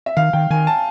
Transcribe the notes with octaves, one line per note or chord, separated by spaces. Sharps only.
E5
D#3 F5
D#3 G5
D#3 G#5
A5